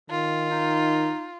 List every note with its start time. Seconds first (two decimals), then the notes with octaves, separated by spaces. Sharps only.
0.10 D#3 F4
0.51 D#4